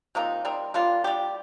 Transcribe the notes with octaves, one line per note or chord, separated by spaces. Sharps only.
C3 F3 A#3 D#4
G3 C4 D#4 A#4
G3 A#3 D4 F4
G3 D4 G4